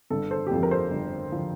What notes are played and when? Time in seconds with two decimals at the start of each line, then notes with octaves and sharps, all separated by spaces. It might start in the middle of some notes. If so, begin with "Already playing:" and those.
0.10 G1 A4
0.31 A4 C5
0.47 G4
0.51 F2 D3 F3 A4
0.63 A#4
0.71 A4 C5
0.91 G1
1.32 D3 F3